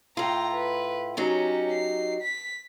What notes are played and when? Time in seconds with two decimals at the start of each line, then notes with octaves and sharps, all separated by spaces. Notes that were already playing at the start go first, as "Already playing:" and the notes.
0.17 A2 F4 G5 A#5
0.51 B4
1.17 F#3 C#4 D#4 G4
1.72 C7
2.22 B6